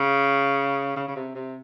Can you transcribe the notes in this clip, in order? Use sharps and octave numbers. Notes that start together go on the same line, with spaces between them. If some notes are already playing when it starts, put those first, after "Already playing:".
Already playing: C#3
C#3
C#3
C3
C3